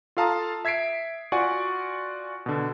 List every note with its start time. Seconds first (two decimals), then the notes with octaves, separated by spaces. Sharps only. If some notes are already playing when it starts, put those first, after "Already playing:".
0.17 F4 A4 F5 A5 A#5 D#6
0.65 E5 G#6 B6 C7 D7
1.32 F4 F#4 D5 F#5 G#5 C#6
2.46 B2 D3